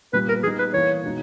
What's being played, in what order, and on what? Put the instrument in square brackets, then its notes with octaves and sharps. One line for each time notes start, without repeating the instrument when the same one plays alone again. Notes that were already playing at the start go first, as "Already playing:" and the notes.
[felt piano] A#2 G3 B3 [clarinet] B4
[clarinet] A#4
[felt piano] G3 B3 D#4 [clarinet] G#4
[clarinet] B4
[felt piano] E3 A#3 E4 [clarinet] C#5
[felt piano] B2 G#3 D#4